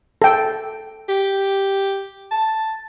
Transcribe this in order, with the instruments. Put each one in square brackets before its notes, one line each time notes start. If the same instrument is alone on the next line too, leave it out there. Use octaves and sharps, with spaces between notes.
[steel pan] A4 G5
[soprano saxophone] G4
A5